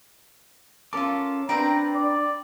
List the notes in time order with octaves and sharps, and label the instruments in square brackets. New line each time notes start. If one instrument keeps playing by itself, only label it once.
[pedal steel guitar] C#4 A#4 D6 [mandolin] F4 A4
[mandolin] C4 B4 G5 [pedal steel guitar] D4 [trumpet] A#5
[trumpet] D5